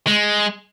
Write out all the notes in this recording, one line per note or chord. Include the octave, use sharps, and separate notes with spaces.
G#3